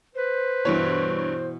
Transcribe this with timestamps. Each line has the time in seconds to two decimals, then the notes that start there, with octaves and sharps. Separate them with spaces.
0.15 B4 C5
0.65 G2 B2 E3 C#5